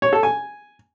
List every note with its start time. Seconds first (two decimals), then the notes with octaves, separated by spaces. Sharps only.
0.02 C#5
0.13 A4
0.23 G#5